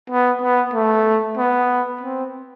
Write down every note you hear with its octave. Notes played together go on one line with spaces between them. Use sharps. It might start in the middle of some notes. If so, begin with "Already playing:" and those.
B3
B3
A3
B3
C4